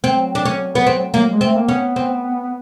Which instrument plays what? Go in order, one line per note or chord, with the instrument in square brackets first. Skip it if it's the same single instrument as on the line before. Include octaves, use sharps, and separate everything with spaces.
[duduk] F#3 [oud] C4
[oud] D4
C#4
B3
C4
A#3
[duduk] G#3
[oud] C4
[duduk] A3
A#3
[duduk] B3 [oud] C#4
[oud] C4